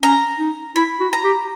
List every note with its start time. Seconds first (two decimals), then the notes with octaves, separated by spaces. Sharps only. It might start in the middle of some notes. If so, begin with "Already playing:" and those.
0.03 C#4 A#5
0.39 D#4
0.76 E4 B5
1.00 F#4
1.13 A#5
1.24 G4